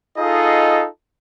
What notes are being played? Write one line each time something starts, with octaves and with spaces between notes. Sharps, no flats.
D#4 F4 G#4 A4 D#5